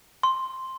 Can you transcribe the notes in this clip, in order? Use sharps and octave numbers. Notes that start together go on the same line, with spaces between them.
C6